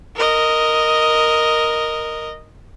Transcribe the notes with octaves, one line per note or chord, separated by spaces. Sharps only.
A#4 D#5